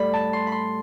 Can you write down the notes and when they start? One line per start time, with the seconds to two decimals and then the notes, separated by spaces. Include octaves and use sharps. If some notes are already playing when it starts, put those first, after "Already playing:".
Already playing: A2 G3 D5 B5
0.13 A5
0.33 C6
0.47 B5
0.52 C6